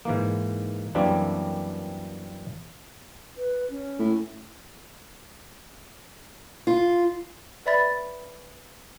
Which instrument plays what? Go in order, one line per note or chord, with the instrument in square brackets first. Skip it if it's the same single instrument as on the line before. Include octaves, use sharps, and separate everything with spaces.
[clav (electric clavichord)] G#2 E3 A#3
F#2 E3 G3 A#3 C4 D4
[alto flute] B4
C#4
[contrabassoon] A2
[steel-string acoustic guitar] F4
[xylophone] B4 D5 E5 B5 A6